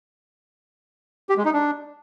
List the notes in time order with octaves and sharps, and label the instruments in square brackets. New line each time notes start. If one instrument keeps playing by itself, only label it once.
[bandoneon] G4
G#3
D#4
D4